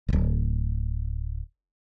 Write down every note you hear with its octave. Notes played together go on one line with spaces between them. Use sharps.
D1 G1